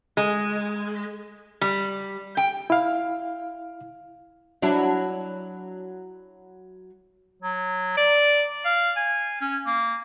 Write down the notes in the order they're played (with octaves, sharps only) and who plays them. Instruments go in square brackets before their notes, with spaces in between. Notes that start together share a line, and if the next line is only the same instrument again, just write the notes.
[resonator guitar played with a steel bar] G#3
G3
G5
[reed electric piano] E4 F5
[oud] F#3 D4 E4
[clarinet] F#3
D5
F5
G#5
C#4
A#3